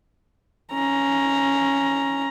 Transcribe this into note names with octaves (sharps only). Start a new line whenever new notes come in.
C#4 A#5